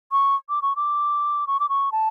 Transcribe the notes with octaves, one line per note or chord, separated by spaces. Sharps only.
C#6
D6
C#6
D6
C#6
D6
C#6
A5